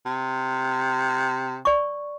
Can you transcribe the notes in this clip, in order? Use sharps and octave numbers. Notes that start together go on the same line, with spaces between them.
C3
D5 C#6